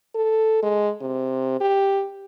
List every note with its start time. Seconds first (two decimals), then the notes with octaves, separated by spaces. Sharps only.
0.15 A4
0.63 G#3
1.01 C3
1.61 G4